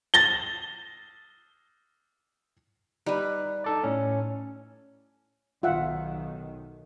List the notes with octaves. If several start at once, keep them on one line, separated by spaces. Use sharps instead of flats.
A6 A#6 G7
G3 D#4 B4
D#4 A4 D5
A2 C#4
B1 D#3 F4 E5 F#5